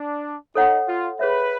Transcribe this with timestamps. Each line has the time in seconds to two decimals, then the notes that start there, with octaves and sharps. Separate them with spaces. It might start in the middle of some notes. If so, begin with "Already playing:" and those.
Already playing: D4
0.55 D#4 A4 C#5 F#5
0.87 F4
1.19 G#4 B4 C#5 E5